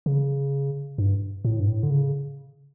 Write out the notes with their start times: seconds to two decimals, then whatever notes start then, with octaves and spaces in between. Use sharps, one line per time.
0.06 C#3
0.98 G2
1.45 A2
1.60 G2
1.68 A2
1.83 D3
1.90 C#3